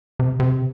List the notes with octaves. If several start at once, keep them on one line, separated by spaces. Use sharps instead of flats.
C3
C3